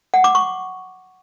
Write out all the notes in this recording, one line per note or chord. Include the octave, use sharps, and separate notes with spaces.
F#5
D6
C#6